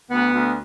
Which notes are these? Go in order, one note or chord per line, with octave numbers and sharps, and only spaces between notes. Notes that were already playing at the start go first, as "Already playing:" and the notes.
D2 B3
D2